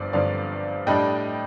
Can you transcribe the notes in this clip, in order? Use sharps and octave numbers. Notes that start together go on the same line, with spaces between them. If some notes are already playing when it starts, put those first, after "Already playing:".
Already playing: G1 G2 F3 C4 D5
G1 G2 D3 F3 C4 D5 F5
A2 G3 D4 D#5 G5